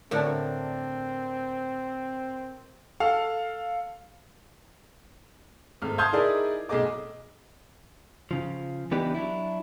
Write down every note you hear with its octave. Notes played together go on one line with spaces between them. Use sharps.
A2 D3 C4 F#4 A#4 D5 A5
A4 F5
G#1 A3 F6
A5 C6 D#6 F6 G6 G#6
D#4 E4 G#4 A#4 D5
B1 A3 G#4 D#5 D6
C#3 F3
E3 B3 D4 D#4 G4 B4
F#3 D4 E4